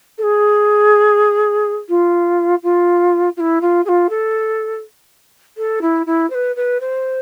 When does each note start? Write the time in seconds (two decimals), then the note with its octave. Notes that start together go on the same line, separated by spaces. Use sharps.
0.18 A4
0.23 G#4
1.89 F4
2.63 F4
3.37 F4
3.40 E4
3.61 F4
3.85 G#4
3.88 F4
4.09 A4
5.57 A4
5.82 E4
6.06 E4
6.30 C5
6.34 B4
6.56 B4
6.80 C5